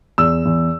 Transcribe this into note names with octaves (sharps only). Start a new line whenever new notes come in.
E2 E6
E2